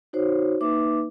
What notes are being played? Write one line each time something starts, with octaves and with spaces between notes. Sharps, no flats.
D#4 F#4 C5 C#5
A#3 D#4 B4 E5 D6